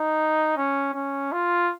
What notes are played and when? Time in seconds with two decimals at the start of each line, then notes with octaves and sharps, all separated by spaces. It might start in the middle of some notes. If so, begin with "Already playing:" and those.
Already playing: D#4
0.57 C#4
0.94 C#4
1.32 F4